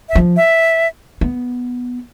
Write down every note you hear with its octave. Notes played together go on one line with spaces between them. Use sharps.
E5
F3
E5
B3